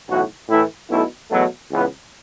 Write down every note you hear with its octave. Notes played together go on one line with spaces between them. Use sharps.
B1 A2 E3 F#4
A2 E3 A3 E4
B1 B2 A3 E4
E2 B2 F#3 A3 A4
C#2 C#3 E3 B3 B4